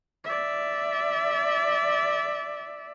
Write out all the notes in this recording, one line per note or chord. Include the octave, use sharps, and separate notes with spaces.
D5 E5